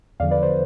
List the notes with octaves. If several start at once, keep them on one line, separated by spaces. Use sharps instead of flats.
E2 D3 F3 D5 F5
B4 D5
C5